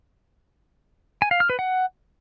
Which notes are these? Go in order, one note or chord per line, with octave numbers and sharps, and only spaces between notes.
G#5
F5
F6
B4
F#5